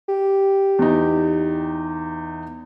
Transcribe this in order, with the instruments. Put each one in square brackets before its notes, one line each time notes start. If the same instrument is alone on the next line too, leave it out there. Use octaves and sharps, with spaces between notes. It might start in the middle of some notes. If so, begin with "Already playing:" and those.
[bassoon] G4
[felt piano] E2 D#4